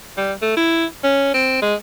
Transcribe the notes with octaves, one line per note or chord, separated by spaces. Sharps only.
G3
A3
E4
C#4
C4
G#3